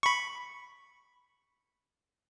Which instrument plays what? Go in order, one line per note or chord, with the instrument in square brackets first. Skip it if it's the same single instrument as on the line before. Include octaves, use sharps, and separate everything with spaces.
[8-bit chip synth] B5 C#6